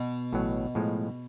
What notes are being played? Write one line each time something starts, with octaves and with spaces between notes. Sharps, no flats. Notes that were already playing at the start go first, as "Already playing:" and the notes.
Already playing: B2
A1 A2 F#3
A2 F3 G#3